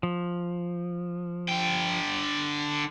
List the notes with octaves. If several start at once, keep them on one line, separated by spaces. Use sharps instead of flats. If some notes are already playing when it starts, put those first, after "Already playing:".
F3
D3 G5